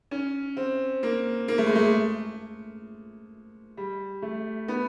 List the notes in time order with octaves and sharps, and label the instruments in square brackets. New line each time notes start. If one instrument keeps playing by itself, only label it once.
[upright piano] C#4
C4
A#3
A#3
A3
G#3
A3
G3
A3
B3